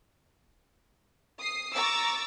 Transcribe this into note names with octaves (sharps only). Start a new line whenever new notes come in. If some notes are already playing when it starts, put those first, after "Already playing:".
D#6 C7
A#5 C#6 D6 E6 A6